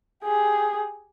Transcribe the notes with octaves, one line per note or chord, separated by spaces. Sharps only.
G4 G#4